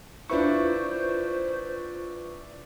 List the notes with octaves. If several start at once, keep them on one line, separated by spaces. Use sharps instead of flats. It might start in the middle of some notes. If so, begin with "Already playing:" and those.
D4 E4 F4 B4 C5 C#6